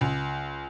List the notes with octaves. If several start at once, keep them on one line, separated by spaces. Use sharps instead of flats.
C#2